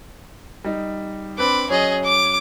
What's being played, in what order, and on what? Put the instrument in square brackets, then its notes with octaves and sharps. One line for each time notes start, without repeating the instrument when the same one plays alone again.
[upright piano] G3 D#4
[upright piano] C4 D4 B4 [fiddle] B5 D6
[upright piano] F#3 C#4 [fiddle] G#4 D#5
[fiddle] D6